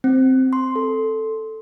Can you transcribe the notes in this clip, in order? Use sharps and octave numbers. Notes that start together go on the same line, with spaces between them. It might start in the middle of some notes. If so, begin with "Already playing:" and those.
C4
C6
A4